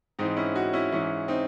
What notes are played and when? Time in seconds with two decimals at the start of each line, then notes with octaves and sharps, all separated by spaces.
0.19 G#2 E3 C4 D#4
0.37 C#4 E4
0.55 D#4 F#4
0.73 C#4 E4
0.92 G#2 E3 C#4 E4
1.28 C4 D#4